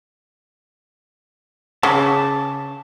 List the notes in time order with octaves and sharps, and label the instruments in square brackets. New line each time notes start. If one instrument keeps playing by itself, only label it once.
[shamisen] C#3 [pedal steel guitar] A5 D6